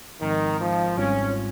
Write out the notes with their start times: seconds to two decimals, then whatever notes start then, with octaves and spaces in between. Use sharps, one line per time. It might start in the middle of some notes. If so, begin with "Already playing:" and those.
0.21 G#1 G#2 D#3 F3 G#3 C4
0.60 F3
0.97 G#1 G#2 G3 C4 C#4 F4